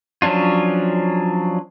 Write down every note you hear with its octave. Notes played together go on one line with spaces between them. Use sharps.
F3 F#3 C#4 D4 F4